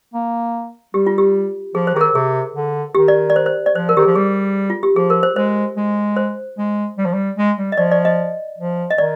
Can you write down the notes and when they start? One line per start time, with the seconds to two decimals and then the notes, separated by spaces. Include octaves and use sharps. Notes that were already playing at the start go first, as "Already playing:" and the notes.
0.14 A#3
0.94 G3 G4
1.07 F4
1.18 G4
1.75 F3 G#4
1.87 C5
1.94 D#3 G#4
2.01 A#4
2.14 C3 G#4
2.55 D3
2.95 D#3 G4
3.08 D5
3.30 D5
3.36 C5
3.46 C5
3.66 D5
3.75 F3 C5
3.89 A#4
3.96 D#3 G4
4.02 F3 G#4
4.16 G3 G#4
4.70 F4
4.83 G4
4.96 F3 G#4
5.10 A#4
5.23 C5
5.36 G#3 C5
5.77 G#3
6.17 C5
6.58 G#3
6.98 G3
7.05 F3
7.14 G3
7.38 G#3
7.58 G3
7.72 D#5
7.77 F3 D5
7.92 D5
8.05 D#5
8.58 F3
8.90 D#5
8.98 D#3 D5